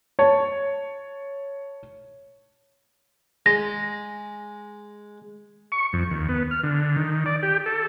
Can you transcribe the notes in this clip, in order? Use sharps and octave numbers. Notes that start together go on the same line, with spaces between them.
C#5 A5 C#6
G#3 A#6
C#6
F2
D#2
B3
F6
D3
D#3
D5
G4
A4